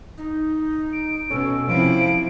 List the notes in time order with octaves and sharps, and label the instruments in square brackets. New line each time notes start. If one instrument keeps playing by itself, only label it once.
[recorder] D#4
[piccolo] D7
[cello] B2 [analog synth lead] C#4 [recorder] A4
[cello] C3 E4 [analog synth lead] F3 [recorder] F5 [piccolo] D7